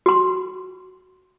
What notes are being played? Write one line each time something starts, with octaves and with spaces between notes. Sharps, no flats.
F#4 C6